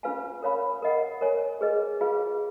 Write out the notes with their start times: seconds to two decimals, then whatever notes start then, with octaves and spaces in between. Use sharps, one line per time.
0.03 C#4 F4 B4 F5 G#5
0.42 A#4 C#5 F5 B5
0.82 A#4 D#5 F#5
1.21 A#4 C#5 G#5
1.61 G#4 B4 D#5
2.01 F4 G#4 B4 F5